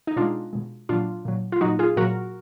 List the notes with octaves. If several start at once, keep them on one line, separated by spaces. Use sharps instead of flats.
D#4
B2 G#3 D4 F4
B2 G#3
A#2 F#3 D4 F4
A#2 F#3
F4
A#2 F#3 D#4 F#4
F4 G#4
A#2 F#3 F#4 A#4